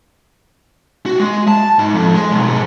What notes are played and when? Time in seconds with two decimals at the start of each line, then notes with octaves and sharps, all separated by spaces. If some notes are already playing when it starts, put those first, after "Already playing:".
1.06 F#4
1.19 G#3
1.48 A5
1.79 G#2
1.94 F2
2.14 G#3
2.32 B1
2.50 G#2